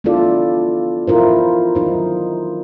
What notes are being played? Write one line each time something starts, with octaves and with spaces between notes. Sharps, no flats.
B3 D4 E4 F4 A4 D5
E4 F4 A#4 C5
F#3 D#4 C5